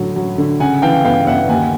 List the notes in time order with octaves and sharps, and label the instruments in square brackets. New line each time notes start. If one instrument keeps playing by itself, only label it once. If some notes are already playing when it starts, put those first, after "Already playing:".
Already playing: [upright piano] A2 D3 F#3
F#3
D3
[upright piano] C#3 [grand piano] F#5 G#5
[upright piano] E3 [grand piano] F5 G5
[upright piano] G1 [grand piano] F5 G5
[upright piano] G1 [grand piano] E5 F#5
[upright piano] D#2 [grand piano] F#5 G#5